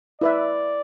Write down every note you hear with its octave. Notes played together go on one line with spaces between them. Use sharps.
E4 B4 D5 E5